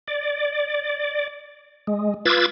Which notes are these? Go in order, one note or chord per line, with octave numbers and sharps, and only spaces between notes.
D5
G#3
F4 B4 D6 E6 G#6 A6